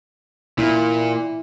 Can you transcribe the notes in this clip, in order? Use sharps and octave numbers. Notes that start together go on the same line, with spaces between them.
A#2 E4